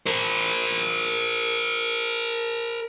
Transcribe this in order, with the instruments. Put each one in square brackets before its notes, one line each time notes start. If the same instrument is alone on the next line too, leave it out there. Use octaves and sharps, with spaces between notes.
[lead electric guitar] A#4 C5